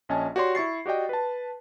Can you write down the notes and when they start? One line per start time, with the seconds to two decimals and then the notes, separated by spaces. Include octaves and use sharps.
0.09 A#1 C#4 D#5 G#5 A5
0.36 F#4 G4 C#5 D5 C6
0.55 E4 C#6 A6 C7
0.86 F#4 G4 D5 D#5 G5
1.09 B4 A5